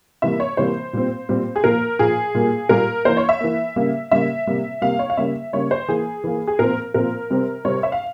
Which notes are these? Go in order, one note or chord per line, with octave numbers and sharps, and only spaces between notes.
C3 E3 G3 A#3 E5
C#5
C3 E3 G3 A#3 C5
A#2 G3 C4
A#2 G3 C4
G#4
A#2 F3 A#3 A#4
A#2 F3 A#3 G#4
A#2 G3 A#3
A#2 G3 A#3 A#4
E3 A#3 C5
C#5
E5
E3 A#3
C#3 G3 A#3
C#3 G3 A#3 E5
C3 G3 A#3
C3 G3 A#3 F5
C#5
F5
C#3 G3 A#3 E5
C#3 G3 A#3 C#5
C5
E3 A#3 G#4
E3 A#3
G#4
A#2 F3 C4 A#4
A#2 F3 C4 A#4
C3 G3 C4
C3 G3 C4 C#5
E5
F5